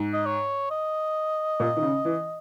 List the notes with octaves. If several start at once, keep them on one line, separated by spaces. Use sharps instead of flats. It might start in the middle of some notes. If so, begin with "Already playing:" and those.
Already playing: G#2
D#5
C#5
D#5
A#2
D#3
C#3
E3